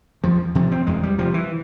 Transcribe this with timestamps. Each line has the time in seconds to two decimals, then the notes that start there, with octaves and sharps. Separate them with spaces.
0.23 E2 F3
0.55 C3 F3
0.72 C4
0.87 E2 G#3
1.03 G3
1.18 C3 F3
1.34 E3